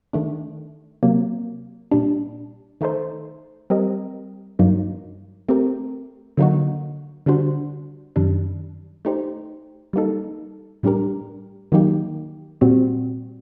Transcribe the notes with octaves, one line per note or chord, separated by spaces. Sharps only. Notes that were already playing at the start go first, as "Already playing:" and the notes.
D#3 A3 D4
C3 F#3 A#3
A#2 G3 D4
D#3 A3 D#4 A4 C5
G3 C4 G4 A#4 D#5
G2 F#3 A#3 D#4
A3 C4 G4 A#4
D3 F#3 A#3 D#4 F#4
D3 G3 D4 F#4 C5
F#2 D#3 G3 D4
A3 D#4 G4 C5
G3 A#3 D#4 A4
A2 G3 D4 G4 A#4
D#3 F#3 A#3 D#4 G4
A#2 G3 C4 F#4